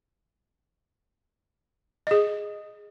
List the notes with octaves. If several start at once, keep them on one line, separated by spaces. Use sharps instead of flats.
G#4 D#5